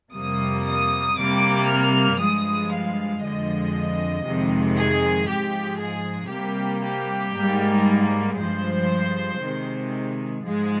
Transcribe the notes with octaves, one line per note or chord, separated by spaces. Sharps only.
F2 C3 G3 A#3 D#6
D#6
C3 G3 A#3 D6
F6
G2 F3 G#3 D#6
F5
F2 D3 F3 G#3 D#5
F2 C3 D#3 G#3
G#4
G#2 F3 G#3 G4
G#4
C3 G3 A#3 G4
G4
G#2 G3 A#3
G2 F3 G#3 C5
C3 D#3 G#3
G#2 F3 G#3